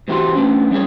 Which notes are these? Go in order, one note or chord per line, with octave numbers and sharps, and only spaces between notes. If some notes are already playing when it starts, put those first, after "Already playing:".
G#2 E3 C4 F#4 G4 C6
A3 B3 C#4 D4
G3 C4 C#4 G#4 C#5